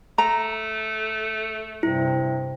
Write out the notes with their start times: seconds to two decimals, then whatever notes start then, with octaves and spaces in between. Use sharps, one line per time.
0.18 A3 A#5
1.83 G2 C3 E4